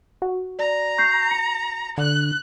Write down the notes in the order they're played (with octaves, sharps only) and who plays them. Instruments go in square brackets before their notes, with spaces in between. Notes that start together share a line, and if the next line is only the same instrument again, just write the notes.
[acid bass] F#4
[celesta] D5 [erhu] A#5
[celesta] C#6 G6 C7
C#7
[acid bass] D3 [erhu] F#6